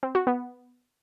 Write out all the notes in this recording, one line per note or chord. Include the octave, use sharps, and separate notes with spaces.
C4
F#4
B3